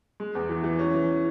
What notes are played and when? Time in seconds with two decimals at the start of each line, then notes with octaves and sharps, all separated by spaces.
0.20 G#3
0.35 E2
0.49 E3
0.64 E3
0.79 C#4
0.94 E3